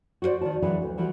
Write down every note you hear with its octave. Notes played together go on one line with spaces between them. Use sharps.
F#4 G4 A#4 C5 D5
D#3 D5 A5
E3 F#3 G#3 D4 B4
D2
E3 F3 G3 F#4